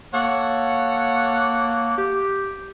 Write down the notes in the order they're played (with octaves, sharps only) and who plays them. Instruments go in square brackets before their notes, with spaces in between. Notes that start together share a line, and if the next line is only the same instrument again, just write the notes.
[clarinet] A#3 [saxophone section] A4 C#5 F#5
[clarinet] G4